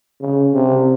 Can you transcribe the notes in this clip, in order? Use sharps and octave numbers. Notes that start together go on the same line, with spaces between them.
C#3
C3